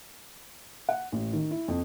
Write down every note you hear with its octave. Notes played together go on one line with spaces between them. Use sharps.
F#5
A1
D#3
E4
F2